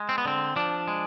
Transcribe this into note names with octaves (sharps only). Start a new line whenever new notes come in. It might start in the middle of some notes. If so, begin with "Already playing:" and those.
Already playing: G#3
C4
B3
D3 C4
F3 D4
G#3